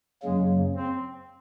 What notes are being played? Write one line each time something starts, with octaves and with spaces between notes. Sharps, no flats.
F#2 C#3 F#3 G#3 A#3
C4